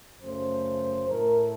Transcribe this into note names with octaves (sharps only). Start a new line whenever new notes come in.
F#2 C#3 A3 C5
A2 A3 A#4